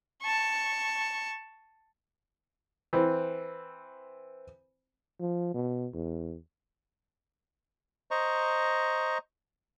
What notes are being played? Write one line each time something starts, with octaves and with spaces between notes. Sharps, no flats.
A5 C#6
E3 C4
F3
B2
E2
C5 D#5 A#5 C#6